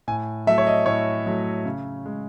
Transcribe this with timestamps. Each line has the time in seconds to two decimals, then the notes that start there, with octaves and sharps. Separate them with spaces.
0.08 A2 G#5
0.47 F#3 A3 E5
0.58 C#5
0.67 D#5
0.86 A2 C#5
1.26 F#3 A3
1.65 C#3
2.06 G#3